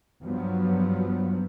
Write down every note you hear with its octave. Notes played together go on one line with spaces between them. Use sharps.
G2 F3 F#3 B3